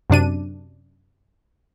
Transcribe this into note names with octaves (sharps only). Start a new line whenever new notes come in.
F#2 C3 D4 D#7